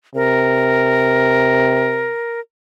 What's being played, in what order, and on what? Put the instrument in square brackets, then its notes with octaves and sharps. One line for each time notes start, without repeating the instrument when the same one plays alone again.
[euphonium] C3 [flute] A#4